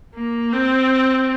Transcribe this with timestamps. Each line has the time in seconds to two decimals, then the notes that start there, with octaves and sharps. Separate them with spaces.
0.15 A#3
0.52 C4